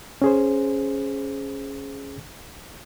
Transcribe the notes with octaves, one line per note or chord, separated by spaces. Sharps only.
C#4 G#4 C5